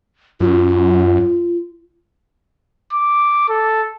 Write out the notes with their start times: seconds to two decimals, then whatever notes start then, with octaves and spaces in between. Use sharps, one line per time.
0.40 F#2 F4
2.93 D6
3.49 A4